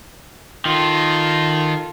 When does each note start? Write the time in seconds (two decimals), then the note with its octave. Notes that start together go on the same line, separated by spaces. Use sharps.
0.65 D#3 F4 A4